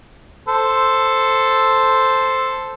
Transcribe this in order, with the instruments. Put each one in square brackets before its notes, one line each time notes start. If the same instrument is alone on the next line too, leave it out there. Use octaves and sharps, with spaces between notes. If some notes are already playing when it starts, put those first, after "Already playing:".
[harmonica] A4 C5